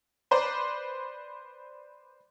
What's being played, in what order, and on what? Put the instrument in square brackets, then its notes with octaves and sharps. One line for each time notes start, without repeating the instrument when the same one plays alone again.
[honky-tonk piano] B4 C5 D5